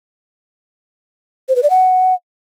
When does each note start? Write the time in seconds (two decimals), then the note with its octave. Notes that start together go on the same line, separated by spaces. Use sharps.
1.49 C5
1.56 B4
1.63 D5
1.70 F#5